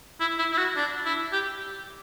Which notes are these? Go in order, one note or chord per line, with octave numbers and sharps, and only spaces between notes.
E4
E4
E4
F#4
D4
E4
G4